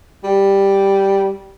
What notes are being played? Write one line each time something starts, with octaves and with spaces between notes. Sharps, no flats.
G3